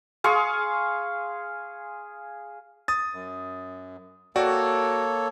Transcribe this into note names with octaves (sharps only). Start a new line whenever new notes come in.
G#4 F5 C6 C#6
D#6 A6
F#2
A#3 F#4 A4 C#5 D5 G5